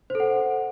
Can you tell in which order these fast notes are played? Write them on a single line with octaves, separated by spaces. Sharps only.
C5 A4 F#5